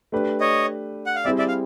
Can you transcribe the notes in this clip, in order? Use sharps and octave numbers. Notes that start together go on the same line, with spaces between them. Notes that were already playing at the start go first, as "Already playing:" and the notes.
A3 D4 G4 B4
C#5 D#5
F#5
F5
G3 C4 E4 G#4 D5 E5
D5 E5
F5